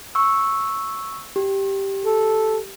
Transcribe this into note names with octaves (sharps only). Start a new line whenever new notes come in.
C#6 E6
G4
A4